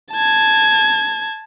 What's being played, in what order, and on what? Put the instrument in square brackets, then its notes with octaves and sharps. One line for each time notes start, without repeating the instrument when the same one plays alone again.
[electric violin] A5 G#6